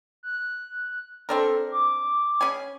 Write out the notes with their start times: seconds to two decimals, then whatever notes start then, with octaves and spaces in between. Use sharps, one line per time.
0.23 F#6
1.29 C4 D4 A4 A#4
1.71 D6
2.41 C#4 G#4 G#5